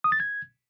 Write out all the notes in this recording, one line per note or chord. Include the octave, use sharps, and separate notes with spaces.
D#6
A6
G#6